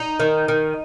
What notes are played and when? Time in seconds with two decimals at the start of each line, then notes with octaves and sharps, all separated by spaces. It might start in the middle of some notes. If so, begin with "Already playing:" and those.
Already playing: D#4
0.20 D#3
0.48 D#3